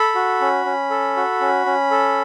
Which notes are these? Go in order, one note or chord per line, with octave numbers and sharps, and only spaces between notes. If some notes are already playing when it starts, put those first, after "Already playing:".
Already playing: A4 B5
F#4
C#4
C#4
A4
F#4
C#4
C#4
A4